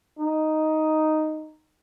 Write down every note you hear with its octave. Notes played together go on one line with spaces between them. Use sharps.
D#4